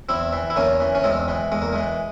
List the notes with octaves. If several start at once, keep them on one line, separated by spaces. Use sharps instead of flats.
E2 C4 E4
E3
E4
E2 A#3 C#4
E3
C#4
E2 G#3 C4
E3
E2 G#3
A#3
E3 G#3